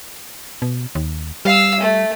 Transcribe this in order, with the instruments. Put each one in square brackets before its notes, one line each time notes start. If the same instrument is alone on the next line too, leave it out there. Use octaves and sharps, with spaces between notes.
[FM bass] B2
D#2
[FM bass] G3 [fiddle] F5 E6
[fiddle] A3